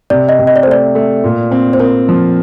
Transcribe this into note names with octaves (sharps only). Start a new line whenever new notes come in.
C3 D5
D#5
C3
D#5
D5
C5
A3 D5
A3
A#2
C4
C5
C4 A#4
F3